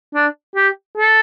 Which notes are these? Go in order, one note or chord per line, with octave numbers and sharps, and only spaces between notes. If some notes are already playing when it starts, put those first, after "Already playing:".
D4
G4
A4